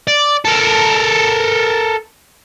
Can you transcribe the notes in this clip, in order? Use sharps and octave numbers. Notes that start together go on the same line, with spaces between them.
D5
A4 A#4